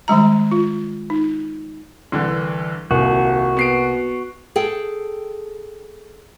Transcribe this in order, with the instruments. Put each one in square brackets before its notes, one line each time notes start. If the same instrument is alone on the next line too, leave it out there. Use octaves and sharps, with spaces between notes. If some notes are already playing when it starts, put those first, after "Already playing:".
[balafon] D#3 G3 G#3 A#5
F4
D#4
[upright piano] C2 D3 E3
[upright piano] D#1 [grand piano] C2 A#3 [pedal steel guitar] F#4
[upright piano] B3 C7 D7
[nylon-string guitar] G#4 A4 G5